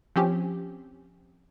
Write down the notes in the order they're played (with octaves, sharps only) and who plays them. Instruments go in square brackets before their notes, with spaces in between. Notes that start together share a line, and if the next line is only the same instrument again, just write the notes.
[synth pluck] F3 C4 C#4 G4